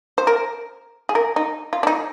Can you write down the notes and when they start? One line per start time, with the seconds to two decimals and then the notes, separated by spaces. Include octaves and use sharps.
0.18 C5
0.27 A#4
1.09 G#4
1.15 A#4
1.36 D#4
1.73 F4
1.83 D4
1.87 D#4